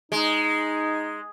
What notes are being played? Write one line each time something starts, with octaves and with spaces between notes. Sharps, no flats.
G#3 D#4